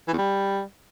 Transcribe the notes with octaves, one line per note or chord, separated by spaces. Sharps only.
E3
E2
G3